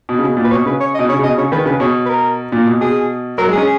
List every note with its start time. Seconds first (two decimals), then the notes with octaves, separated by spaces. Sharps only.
0.09 B2
0.19 C#3
0.23 B2
0.37 A#2
0.44 B4
0.51 B2 C#5
0.66 C#3 B4
0.80 C#5
0.95 D#5
0.99 B2
1.09 C#3 C#5
1.19 C#3
1.23 B2 D#5
1.38 C#3 C#5
1.52 D#3 B4
1.66 C#3 B4
1.80 B2 C#5
2.06 B4
2.09 A#4
2.52 A#2
2.66 B2
2.81 B2 G#4
3.38 F#3 A#4
3.47 G#3
3.52 G#4
3.57 C#4